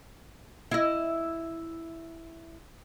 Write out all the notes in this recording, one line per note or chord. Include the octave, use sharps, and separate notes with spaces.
E4 D#5